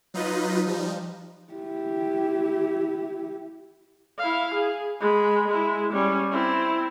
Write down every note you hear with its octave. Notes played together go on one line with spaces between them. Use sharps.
F#3 D#4 F4 B4 D#5
F3 G3 D#4
E4 G4
E4 F5
G#4
G#3 B5
G#3 E4
G3 C#4
C4 E4